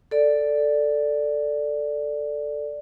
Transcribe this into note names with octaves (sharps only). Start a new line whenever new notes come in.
A4 D5